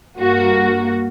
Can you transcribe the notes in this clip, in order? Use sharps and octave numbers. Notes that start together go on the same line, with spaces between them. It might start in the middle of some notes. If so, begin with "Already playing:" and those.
G2 A#3 F#4